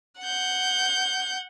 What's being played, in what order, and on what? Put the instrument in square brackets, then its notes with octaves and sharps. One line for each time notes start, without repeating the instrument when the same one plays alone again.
[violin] F#5 G6